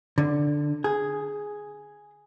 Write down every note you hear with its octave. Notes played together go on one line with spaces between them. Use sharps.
D3
G#4